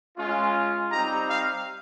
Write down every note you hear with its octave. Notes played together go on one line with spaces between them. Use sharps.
G#3 C#4 F4
G3 C4 D#4 G4 A#5
F5